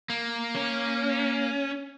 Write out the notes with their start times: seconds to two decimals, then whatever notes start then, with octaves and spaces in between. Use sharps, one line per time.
0.10 A#3
0.56 C#4